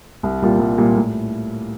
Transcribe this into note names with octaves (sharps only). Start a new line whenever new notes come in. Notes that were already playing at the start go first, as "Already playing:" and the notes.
C2
A#2 G3 A#3 F4
C2
A#2 G3 A#3 F4
A2